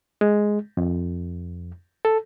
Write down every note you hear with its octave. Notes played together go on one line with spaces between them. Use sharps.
G#3
F2
A4